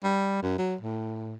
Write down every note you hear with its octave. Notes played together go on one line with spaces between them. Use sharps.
G3
F#2
F#3
A2